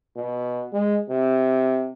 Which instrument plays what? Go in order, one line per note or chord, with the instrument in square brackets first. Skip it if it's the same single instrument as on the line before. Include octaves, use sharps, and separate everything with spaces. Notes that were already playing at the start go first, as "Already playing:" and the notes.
[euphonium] B2
G#3
C3